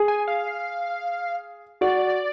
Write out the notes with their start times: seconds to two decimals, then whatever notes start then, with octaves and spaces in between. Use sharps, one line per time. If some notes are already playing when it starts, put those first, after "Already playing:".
Already playing: G#4
0.08 G#5
0.28 F5
1.81 F#4 D5